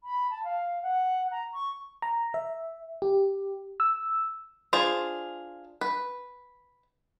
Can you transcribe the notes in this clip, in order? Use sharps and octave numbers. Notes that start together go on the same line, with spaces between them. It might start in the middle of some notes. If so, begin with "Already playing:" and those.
B5
A5
F5
F#5
A#5
C#6
A#5
E5
G4
E6
D4 F4 G#4 C5
B4